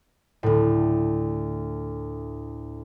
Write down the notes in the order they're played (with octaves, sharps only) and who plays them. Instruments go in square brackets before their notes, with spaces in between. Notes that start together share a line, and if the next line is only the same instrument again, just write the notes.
[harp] D2 A2